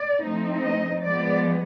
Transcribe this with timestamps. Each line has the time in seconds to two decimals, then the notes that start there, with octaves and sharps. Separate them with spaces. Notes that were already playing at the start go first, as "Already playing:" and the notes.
Already playing: D5
0.22 F3 A3 C4 D#4
0.63 D#5
1.03 F3 G#3 B3 D5